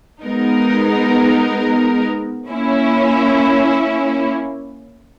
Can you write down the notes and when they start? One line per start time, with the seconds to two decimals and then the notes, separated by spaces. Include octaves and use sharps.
0.23 G#3 B3 D#4 A#4
2.49 A#3 C#4 E4